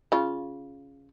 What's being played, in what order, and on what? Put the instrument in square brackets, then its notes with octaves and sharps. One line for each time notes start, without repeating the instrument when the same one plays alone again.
[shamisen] C#3 F4